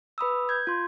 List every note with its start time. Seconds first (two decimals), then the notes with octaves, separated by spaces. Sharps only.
0.18 B4 B5 D#6 E6
0.49 G6 G#6
0.67 F4 C6